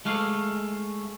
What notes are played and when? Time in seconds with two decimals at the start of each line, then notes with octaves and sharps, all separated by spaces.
0.05 G#3 A3 F5